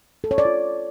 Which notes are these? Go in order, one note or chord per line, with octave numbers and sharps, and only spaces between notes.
A4
C#5
D5
F4